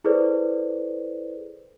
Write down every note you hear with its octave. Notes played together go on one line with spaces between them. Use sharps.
E4 G#4 A4 B4 C5 D5